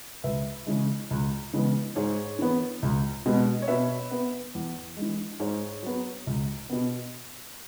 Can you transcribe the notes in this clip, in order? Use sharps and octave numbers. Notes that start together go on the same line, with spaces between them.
C#2 B4 E5
C#3 E3 G#3
C#2
C#3 E3 G#3 B3
G#2 G#4 C#5
E3 B3
C#2
B2 G#3 B3
C#5
B2 B4 E5
B3
E2
G#3
E3
G#2 G#4 C#5
F#3 B3
C#2
B2 B3